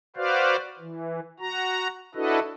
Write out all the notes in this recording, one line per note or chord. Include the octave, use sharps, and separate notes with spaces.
F#4 B4 C5 D5 F5
E3
F#4 A#5
D4 E4 F#4 A4 B4 D#5